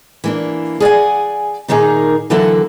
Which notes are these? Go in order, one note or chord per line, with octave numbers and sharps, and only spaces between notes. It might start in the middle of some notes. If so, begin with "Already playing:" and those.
E3 A#3 D4
G#4 D5 F#5 G#5
A#2 D#3 A#3 D#4 G#4
D3 E3 F#3 A#3 F#4 A4